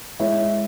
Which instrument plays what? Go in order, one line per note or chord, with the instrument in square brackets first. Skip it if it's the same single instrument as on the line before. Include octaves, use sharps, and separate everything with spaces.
[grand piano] G#3 E4 C#5 E5